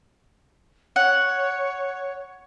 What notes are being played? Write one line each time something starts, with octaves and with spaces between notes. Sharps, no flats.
C#5 F#5